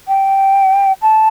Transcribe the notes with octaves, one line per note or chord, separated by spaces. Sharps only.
G5
A5